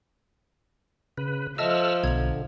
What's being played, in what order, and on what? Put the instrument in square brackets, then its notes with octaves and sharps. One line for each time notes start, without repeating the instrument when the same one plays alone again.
[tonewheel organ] C#3 B4
[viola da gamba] F3 [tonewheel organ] A4 E6 F6 [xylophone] D#5 E5 A5
[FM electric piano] B1 [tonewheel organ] D3 [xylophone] G#6 F7